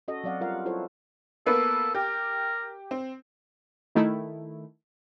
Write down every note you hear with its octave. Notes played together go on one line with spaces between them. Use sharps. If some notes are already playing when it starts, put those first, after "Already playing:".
C#4 F#4 A4 D#5
F#3 C4 D5 F5 F#5
G3 F4 A#4 F5 F#5
E4 F4 A4 C5 C#5
A#3 B3 A4 B4
G4 A#4
C4
D#3 A3 E4